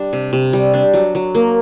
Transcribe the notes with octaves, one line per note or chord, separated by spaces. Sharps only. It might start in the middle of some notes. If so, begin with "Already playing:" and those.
Already playing: G3 D4
C3
C3
G3
D4
F#3
F#3
A#3